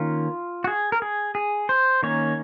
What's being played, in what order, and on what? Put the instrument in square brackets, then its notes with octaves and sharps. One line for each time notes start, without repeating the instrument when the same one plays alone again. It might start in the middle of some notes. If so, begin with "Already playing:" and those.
Already playing: [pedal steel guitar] D#3 A#3 C#4 F4
F#4
G#4
A#4
G#4
G#4
C5
D#3 A#3 C#4 C#5